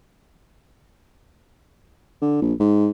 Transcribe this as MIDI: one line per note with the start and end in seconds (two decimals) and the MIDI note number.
2.22 2.42 50
2.42 2.53 34
2.60 2.90 44